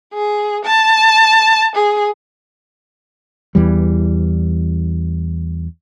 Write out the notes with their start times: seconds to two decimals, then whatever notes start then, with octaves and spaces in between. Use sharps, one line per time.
0.13 G#4
0.65 A5
1.75 G#4
3.55 E2 E3 G3